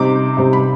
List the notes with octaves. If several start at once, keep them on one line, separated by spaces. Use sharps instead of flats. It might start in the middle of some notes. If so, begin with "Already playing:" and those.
Already playing: C3 G3 C4 D#4 D6
C3 G3 C4 D#4
B5